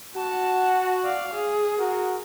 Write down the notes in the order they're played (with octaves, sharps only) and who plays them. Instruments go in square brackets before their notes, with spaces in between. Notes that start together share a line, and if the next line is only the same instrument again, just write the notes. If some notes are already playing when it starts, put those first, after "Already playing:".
[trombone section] F#4 [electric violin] A5
[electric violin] D5 F5
G#4
[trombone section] F#4 A#4